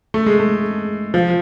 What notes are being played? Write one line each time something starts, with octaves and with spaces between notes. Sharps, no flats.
A3
G#3
A3
F3